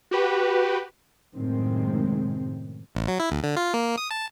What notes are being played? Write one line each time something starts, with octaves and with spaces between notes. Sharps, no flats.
F#4 G4 B4
F#2 A2 C3 D#3 G#3 C4
A1
F#3
E4
D2
D3
F4
A#3
D#6
A5